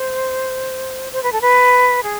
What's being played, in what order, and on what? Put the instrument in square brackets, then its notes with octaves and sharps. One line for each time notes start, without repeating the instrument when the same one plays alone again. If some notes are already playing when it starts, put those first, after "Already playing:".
Already playing: [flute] C5
C5
B4
A4
B4
G#4